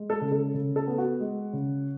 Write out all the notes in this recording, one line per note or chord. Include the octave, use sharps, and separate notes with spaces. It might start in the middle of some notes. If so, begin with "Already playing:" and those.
Already playing: G#3
A4
C#3
A4
C#3
A4
B3
F#4
G#3
C#3